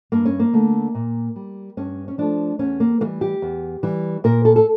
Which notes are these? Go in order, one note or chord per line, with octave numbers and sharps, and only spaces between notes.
G2 A#3
C#4
A#3
D3 A3
A#2
G3
G2 C#4
C#4
F3 A3 D4
E2 C#4
A#3
E3 G3 A#3
G4
E2
E3 G3
A#2 A#4
A4
A4